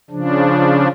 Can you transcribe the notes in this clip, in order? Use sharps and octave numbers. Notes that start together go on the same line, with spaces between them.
C#3 F3 D4